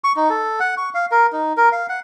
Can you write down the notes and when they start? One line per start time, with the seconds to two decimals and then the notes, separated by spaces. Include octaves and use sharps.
0.04 C#6
0.16 D#4
0.30 A4
0.60 F#5
0.77 C#6
0.94 F5
1.11 A#4
1.32 D#4
1.57 A#4
1.72 F5
1.89 F#5